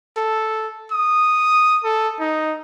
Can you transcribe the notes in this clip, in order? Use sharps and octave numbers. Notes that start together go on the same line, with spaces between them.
A4
D#6
A4
D#4